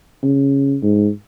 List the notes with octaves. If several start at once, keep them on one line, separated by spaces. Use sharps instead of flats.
C#3
G#2